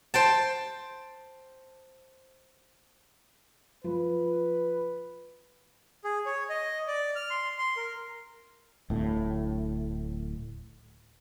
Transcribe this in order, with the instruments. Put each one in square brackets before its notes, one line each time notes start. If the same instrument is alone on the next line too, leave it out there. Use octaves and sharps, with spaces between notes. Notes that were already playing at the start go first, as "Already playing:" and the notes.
[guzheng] C5 G5 A5
[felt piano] F3 [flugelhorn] B4
[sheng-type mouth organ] G#4
C#5
D#5
D5
F6
C6
C6
A#4
[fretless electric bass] D1 A2